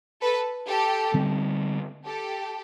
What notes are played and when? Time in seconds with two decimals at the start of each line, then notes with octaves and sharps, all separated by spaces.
0.23 A4 B4
0.68 G4 A4
1.14 D3 G3 C4
2.06 G4 A4